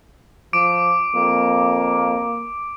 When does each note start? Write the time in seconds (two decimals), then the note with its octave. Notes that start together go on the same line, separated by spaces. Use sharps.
0.53 F3 D6 D7
1.15 F2 A#3